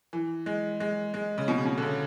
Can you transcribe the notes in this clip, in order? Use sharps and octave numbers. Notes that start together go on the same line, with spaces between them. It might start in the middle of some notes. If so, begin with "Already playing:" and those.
E3
G#3
G#3
G#3
C#3
B2
C#3
B2
D3
C#3